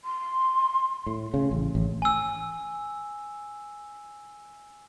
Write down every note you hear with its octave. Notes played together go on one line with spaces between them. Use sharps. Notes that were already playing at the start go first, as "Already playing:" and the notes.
C6
A2
C#3
A1
A1
G#5 E6